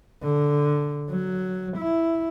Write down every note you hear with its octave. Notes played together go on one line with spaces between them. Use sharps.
D3
F#3
E4